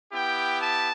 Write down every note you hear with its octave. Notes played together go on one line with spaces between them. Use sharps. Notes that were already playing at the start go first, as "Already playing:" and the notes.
B3 E4 G4 G5
A5